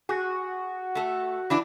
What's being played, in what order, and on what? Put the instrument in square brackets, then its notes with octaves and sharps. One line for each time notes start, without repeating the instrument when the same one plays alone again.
[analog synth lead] F#4 [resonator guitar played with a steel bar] G#4
[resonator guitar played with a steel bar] A3 A4
E3 D4 E4